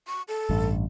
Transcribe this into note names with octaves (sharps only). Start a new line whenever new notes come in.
C#6
A4
A1 G2